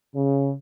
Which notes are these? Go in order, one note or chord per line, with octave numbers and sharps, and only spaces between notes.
C#3